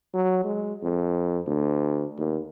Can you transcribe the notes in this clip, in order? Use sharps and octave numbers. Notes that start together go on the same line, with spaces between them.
F#3
G#3
F2
D2
D#2